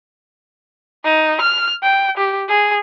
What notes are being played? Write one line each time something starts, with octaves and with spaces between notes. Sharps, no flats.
D#4
F6
G5
G4
G#4